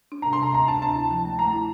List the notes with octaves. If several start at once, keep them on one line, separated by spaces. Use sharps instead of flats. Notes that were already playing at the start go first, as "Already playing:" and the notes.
D4
C3 A#5
C6
C3 A#5
D2 A#5
D4 A5
D2 A5
E4
F3
A3
A3 A#5
E4